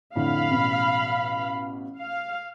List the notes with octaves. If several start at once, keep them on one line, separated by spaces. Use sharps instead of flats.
F2 A2 D3 F5 B5
A1 B2
F5